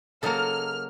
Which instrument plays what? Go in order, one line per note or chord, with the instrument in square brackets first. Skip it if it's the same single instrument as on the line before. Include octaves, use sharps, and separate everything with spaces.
[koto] C#3 F#3 A#3 [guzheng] A4 D#5 [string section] F6